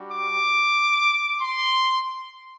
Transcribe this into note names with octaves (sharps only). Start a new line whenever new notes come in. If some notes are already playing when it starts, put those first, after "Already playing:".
Already playing: G3 D4 F#4
D6
C6